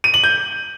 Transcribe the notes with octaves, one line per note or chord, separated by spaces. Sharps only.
D#7
F#7
G6